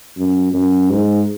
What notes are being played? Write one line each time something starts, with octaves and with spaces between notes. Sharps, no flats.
F#2
F#2
G#2